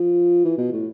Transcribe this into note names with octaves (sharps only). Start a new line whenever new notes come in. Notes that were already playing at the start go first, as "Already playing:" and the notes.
Already playing: F3
E3
B2
A2